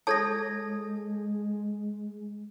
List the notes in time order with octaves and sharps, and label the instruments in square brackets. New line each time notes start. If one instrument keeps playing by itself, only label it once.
[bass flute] G#3 [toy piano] A4 C#5 A5 [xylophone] D#6 G#6 A#6